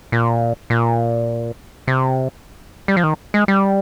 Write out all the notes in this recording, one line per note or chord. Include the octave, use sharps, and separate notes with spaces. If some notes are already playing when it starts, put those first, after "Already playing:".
A#2
A#2
C3
G3
F3
D#3
G#3
G3